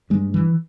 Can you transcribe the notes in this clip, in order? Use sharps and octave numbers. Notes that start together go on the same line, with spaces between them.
G2 G#3
E3